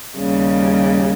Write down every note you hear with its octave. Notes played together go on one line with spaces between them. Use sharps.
D#2 C#3 G3